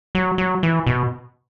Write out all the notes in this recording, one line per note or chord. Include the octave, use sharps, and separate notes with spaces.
F#3
F#3
E3
B2